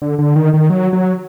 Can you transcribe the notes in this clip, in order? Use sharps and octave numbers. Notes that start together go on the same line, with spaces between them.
D3
D3
D#3
D#3
F#3
F#3